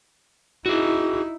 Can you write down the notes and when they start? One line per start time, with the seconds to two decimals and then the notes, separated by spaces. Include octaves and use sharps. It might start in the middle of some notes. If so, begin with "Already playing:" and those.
0.66 D#4 E4 F#4 G#4